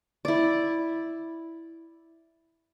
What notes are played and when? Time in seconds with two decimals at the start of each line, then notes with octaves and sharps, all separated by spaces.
0.25 E4 D5